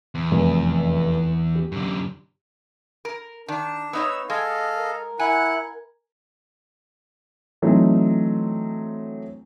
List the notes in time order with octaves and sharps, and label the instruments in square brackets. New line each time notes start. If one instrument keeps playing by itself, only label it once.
[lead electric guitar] E2
[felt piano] F1
G4
[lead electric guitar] F#2 D3
[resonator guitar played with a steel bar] A#4
[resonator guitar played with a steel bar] D#3 [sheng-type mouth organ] D4
[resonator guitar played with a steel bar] B3 D#4 C#5 [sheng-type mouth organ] E6
[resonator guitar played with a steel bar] G#3 [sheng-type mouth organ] A4 D#5 F5
[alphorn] A#4
[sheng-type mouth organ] E4 F#5 F#6 [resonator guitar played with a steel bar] G#5
[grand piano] E3 F#3 A3 C4 D4 D#4